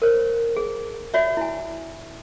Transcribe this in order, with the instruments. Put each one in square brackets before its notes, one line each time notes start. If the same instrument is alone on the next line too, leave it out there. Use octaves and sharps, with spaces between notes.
[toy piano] A#4 C5 C#5
G#4
F#4 C#5 D5 E5
E4 G#5